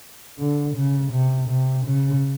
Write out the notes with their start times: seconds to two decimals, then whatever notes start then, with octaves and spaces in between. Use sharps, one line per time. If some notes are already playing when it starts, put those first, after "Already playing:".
0.39 D3
0.75 C#3
1.12 C3
1.49 C3
1.86 C#3